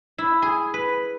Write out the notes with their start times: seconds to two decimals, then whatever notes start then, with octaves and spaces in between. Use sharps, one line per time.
0.18 E4
0.42 G#4
0.74 B4